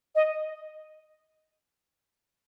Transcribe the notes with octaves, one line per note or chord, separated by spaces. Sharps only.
D#5